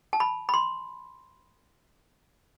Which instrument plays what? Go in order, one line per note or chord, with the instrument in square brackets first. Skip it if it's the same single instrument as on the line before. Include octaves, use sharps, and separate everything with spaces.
[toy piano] A5
B5
B5
C6